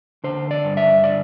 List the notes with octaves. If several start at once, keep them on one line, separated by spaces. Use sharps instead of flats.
D3 C5
D5
G2
E5
D3 D5